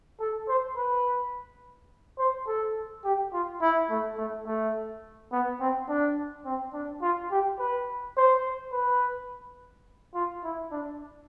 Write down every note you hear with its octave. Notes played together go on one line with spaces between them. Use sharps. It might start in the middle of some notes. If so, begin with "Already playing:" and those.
A4
C5
B4
C5
A4
G4
F4
E4
A3
A3
A3
B3
C4
D4
C4
D4
F4
G4
B4
C5
B4
F4
E4
D4